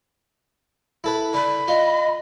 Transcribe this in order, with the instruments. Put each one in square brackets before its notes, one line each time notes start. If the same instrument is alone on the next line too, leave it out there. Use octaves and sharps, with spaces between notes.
[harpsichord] E4 A4 B4
[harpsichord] D3 [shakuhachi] B5
[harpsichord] F4 [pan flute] D#5